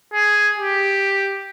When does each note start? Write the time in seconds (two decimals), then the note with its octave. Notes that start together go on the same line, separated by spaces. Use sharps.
0.13 G#4
0.58 G4